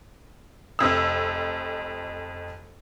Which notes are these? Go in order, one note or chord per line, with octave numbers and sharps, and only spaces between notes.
F1 F2 E6